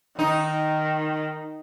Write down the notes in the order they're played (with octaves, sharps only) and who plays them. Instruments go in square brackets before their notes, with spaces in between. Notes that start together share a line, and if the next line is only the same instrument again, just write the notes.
[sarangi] D#3 [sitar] D#4